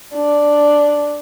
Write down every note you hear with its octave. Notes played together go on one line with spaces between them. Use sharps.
D4